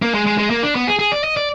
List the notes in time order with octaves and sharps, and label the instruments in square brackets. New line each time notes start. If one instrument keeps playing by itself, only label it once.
[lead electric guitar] A#3
G#3
G#3
G#3
A#3
D4
B3
G#4
G#4
D5
D#5
D5